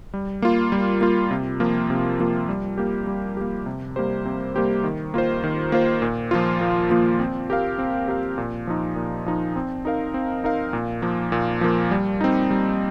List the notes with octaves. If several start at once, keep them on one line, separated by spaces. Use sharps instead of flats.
G3
A#3 F4
G3
A#3 F4
C3
F3 A#3 F4
C3
F3 A#3 F4
G3
A#3 G4
G3
A#3 G4
C3
G3 A#3 G4 C5
C3
G3 A#3 G4 C5
D#3
A#3 F4 C5
D#3
A#3 F4 C5
A#2
F3 A#3 F4
A#2
F3 A#3 F4
C4
G4 A#4 F5
C4
G4 A#4 F5
A#2
F3 D#4
A#2
F3 D#4
C4
D#4 A#4 F5
C4
D#4 A#4 F5
A#2
F3 A#3
A#2
F3 A#3
G3
C4 D#4
G3